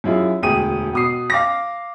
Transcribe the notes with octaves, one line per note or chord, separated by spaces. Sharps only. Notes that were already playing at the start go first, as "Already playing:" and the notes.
F#2 E4 F4 G#4
E1 D2 G#4 G5 D#6 D#7
B2 D#6 C7
F5 D6 A#6